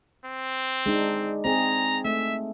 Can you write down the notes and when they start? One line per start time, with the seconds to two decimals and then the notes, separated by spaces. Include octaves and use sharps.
0.25 C4
0.86 G#3 D4 D#4
1.45 C4 G#4 A#5
2.05 A3 E5